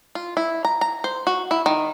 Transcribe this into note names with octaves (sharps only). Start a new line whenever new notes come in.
F4
E4
A#5
A#5
C5
F#4
E4
D#3